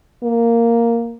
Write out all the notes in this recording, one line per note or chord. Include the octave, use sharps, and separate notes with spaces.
A#3